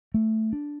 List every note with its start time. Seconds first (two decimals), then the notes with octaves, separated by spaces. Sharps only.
0.14 A3
0.53 D4